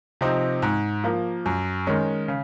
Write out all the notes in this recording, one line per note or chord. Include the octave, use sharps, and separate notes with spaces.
C3 F3 C4 D#4
G#2
F3 A#3
F#2
D#3 G#3 C#4
C#3